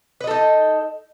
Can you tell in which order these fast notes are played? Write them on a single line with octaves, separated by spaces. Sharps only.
B4 D#5 A4 D#4